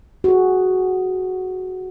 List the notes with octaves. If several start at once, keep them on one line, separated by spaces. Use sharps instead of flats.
F#4 G#4